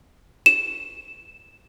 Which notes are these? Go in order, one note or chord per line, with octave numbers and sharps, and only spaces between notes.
E7